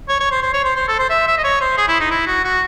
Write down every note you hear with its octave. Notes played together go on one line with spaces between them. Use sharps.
C#5
C#5
C5
C5
C#5
C5
C5
A4
C5
E5
E5
D#5
C#5
C5
G#4
E4
D#4
E4
F#4
F#4